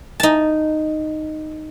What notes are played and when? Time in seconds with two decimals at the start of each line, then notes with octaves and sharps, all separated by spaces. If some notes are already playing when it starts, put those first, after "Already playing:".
0.20 D#4 A5